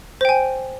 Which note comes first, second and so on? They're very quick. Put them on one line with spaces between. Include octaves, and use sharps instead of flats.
C5 G5 G#5